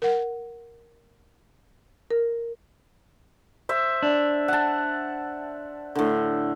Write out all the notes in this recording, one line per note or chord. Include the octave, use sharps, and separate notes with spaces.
A#4 F#5
A#4
C5 E5
D4
F#5 A5
A2 D3